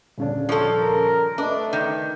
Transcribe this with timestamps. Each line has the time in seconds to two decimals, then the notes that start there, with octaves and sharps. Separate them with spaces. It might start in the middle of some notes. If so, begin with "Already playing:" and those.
0.18 D#1 C#3 D4
0.49 F3 A4 C#5
0.79 A#4
1.38 A3 D4 B4 D#5
1.73 D#3